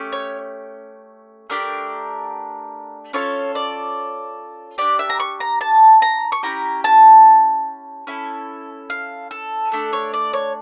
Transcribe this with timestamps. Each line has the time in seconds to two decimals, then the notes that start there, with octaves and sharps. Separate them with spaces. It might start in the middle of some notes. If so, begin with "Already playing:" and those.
Already playing: A3 C#4 G4
0.12 C#5
1.50 A3 D4 G4 A#4
3.13 C#4 F4 A4 C#5
3.55 D5
4.78 D4 G4 D5
4.99 E5
5.10 A#5
5.20 C#6
5.40 A#5
5.61 A5
6.02 A#5
6.32 C#6
6.43 C#4 E4 G4 A#5
6.84 A5
8.07 C#4 E4 A4
8.90 F5
9.31 A4
9.72 A3 D4 A4
9.93 C#5
10.13 D5
10.33 C#5